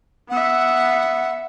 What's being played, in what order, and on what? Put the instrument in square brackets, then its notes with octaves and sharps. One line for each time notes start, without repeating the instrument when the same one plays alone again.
[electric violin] B3 E5 [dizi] F#5